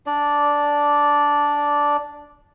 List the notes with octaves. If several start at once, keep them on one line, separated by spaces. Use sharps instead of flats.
D4 D5